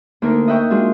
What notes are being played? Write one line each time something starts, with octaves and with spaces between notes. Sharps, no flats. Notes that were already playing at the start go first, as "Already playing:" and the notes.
D2 A#3 D#4 A#4
D#5 E5 F#5 G5 C#6
G#3 D4 F4 F#4